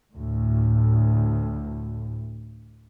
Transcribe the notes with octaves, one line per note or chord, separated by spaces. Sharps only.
D2 A2